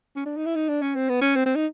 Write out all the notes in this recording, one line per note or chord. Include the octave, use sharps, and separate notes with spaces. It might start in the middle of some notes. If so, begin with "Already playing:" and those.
C#4
D4
D#4
E4
D#4
D4
C#4
C4
B3
C#4
C4
C4
D#4